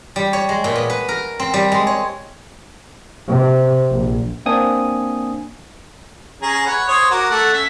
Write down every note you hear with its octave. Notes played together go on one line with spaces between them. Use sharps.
G3
C#5
G#3
A#2
B3
B4
A#4
C4
G3
G#3
C#5
C3
A#1
A#3 C4 D4 G#5 D#6
C#4 G#4 A#5
B4 C#5 F#5
C5 C#5 D#6
F#4 A#4 D6
A3 F#5
C#4 E5